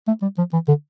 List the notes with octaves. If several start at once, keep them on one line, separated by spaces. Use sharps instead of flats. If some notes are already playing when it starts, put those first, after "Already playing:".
A3
G3
F3
E3
D3